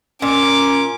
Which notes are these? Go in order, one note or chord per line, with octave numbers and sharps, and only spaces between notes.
A#2 C#4 D6